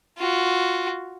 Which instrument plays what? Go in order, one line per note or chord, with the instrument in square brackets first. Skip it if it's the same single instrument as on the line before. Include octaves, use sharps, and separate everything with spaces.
[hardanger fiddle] F4 F#4